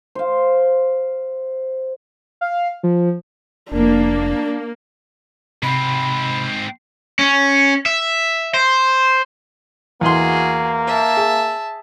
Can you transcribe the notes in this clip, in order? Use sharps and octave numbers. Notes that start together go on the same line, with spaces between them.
C5 F5
F5
F3
F1 A#3 D4
G#2 C3 C4 B5
C#4
E5
C5
E2 A#3 F#4 G#4 C6
E5 A5
G#4